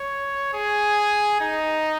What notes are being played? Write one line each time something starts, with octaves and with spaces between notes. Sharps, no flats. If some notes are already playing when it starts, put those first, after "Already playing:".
Already playing: C#5
G#4
D#4